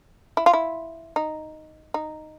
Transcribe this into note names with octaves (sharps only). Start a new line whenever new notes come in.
E4
F4
E4
D#4
D#4